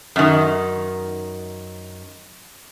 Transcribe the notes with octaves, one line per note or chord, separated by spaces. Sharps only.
F#2 D#3